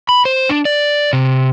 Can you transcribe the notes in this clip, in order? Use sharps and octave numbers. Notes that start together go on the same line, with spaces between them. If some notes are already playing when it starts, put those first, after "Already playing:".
B5
C5
D4
D5
C3